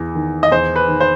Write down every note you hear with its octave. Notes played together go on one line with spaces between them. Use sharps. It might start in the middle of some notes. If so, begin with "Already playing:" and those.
Already playing: E2 E3
D#3
D#5
E2 C5
B4
D#3
C5